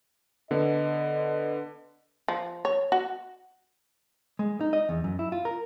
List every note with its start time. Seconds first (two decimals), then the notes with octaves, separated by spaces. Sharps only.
0.51 D3 B3 D#5
2.28 F3
2.65 C#5
2.92 F#4
4.39 G#3
4.61 D#4
4.73 D#5
4.89 E2
5.04 F#2
5.19 E4
5.32 F4
5.45 A#4